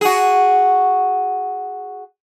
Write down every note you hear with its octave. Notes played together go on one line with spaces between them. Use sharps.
F#4 G#4